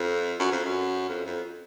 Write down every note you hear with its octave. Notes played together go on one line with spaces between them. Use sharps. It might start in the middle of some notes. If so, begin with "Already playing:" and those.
Already playing: F2
F#2
F2
F#2
F2
F2